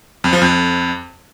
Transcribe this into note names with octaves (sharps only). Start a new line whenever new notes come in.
F2
F3
F2